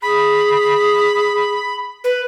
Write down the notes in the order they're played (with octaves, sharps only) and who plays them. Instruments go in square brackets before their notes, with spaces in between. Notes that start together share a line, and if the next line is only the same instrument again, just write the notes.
[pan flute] G#4 [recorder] B5
[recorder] B4